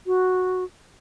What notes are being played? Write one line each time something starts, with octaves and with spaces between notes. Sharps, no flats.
F#4